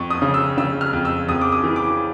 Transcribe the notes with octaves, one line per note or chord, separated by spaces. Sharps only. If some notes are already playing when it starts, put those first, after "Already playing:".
Already playing: F2 C#6
D#6
C#3
E6
C#3 E6
F6
F2
E6
F2 D#6
D6
D#6
E3
D6